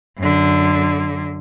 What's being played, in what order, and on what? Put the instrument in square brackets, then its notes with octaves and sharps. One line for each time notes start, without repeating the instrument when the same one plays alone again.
[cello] F#2 D3